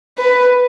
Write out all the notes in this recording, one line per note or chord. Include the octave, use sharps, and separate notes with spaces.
B4